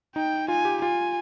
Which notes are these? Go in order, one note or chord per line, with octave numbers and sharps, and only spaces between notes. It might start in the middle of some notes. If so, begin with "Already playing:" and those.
D#4 G5
F4 G#5
G4
F4 G#5